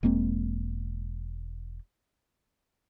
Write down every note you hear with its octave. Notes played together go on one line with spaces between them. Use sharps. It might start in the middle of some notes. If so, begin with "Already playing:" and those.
E1 G#3 A#3 C4